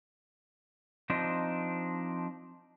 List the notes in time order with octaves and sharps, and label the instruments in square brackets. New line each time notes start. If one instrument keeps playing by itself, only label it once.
[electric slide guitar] F3 C4 D4 D#4